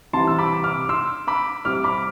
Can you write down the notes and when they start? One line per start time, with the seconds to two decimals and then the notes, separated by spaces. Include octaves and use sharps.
0.13 C2 C3 E3 G3 A5 C6
0.27 E6
0.39 B5 D6
0.64 D6 F6
0.89 C6 E6
1.27 B5 D6
1.65 C2 C3 G3 C4 D6 F6
1.84 B5 D6